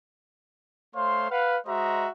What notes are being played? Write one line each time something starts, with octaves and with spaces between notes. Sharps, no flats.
A3 C5 C#5 F5 C6
B4 F5 F#5
G#3 F#4 C5 D#5 E5 A#5